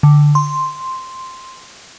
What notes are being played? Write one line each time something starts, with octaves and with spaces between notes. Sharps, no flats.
D3
C6